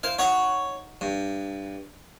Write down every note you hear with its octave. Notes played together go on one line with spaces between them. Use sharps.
E4 C5 F5
D#4 C#5 F#5 C#6
G2